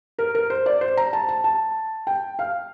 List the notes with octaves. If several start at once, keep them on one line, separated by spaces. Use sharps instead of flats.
A#4
A#4
C5
D5
C5
A#5
A5
A5
A5
G5
F5